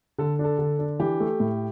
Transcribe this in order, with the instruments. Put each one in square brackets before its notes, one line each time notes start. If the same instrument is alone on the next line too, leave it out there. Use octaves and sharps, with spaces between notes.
[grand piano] D3 [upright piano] A4
[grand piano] D4 [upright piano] A4
[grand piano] D3
D4
[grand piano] E3 [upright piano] G4
[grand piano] A3
A2